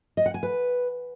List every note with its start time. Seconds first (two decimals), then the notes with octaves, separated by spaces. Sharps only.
0.17 D#5
0.26 F#5
0.34 G#5
0.43 B4